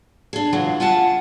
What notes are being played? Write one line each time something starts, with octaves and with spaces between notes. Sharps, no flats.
D4 G#4
C#3 E3 F#3 G#3 F4
C#4 F4 G#4 E5 F#5 A5